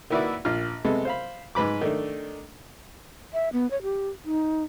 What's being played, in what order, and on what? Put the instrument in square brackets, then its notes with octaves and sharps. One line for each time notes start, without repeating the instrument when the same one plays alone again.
[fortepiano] D#3 A#3 E4 F#4 B4 D5
A#1 F4 F6
C3 G#3 B3 A4
C5 F5 B5
G#2 B4 B5 D6
D#3 A3 D4
[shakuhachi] E5
B3
C#5
G4
D#4